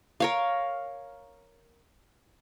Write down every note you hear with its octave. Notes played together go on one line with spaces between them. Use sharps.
A#4 C#5 F5